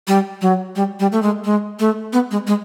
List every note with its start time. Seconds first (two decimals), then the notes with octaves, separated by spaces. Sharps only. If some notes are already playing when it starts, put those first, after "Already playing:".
0.08 G3
0.42 F#3
0.76 G3
1.00 G3
1.12 A3
1.22 G#3
1.45 G#3
1.80 A3
2.13 B3
2.31 G#3
2.47 G#3